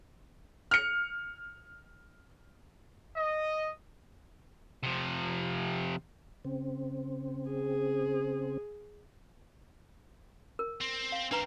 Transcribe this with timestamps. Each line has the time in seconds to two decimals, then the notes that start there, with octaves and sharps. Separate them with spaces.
0.71 F6 C#7
3.15 D#5
4.83 C3 F3
6.45 C#3 C4
7.50 G#4
10.59 A#4
10.81 C4
11.12 F5
11.31 C4 D4 A#4 B4 A#5